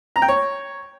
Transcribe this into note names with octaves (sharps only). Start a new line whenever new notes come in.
A#5
G5
C#5